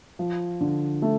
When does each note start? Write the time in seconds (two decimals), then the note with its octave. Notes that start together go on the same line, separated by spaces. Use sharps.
0.19 F3
0.61 D3
1.02 A3